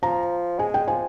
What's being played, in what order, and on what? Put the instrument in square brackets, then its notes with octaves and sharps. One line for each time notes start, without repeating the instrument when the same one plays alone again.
[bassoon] F3 [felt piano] A#5
[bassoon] G#3 [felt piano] G#5
[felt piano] G5
[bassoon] F3 [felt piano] G#5